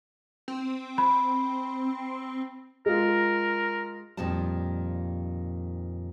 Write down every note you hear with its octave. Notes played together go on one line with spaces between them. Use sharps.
C4
B5
G#3 F4 A#4
F2 A#2 D#3 G3 A5